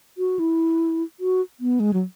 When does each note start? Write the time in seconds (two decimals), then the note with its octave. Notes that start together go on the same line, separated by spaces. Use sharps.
0.18 F#4
0.39 E4
1.20 F#4
1.60 B3
1.80 G#3
1.93 F#3